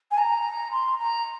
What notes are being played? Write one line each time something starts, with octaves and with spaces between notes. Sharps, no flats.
G#5
A#5
C6
A#5